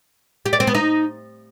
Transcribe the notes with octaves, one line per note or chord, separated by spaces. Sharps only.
G4
D5
C4
B3
D#4